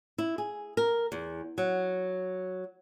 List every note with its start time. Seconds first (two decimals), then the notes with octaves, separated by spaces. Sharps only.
0.18 E4
0.38 G#4
0.77 A#4
1.12 E2
1.58 F#3